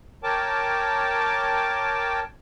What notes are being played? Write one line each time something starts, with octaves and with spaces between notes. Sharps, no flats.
A#4 C#5 G5 A5 D6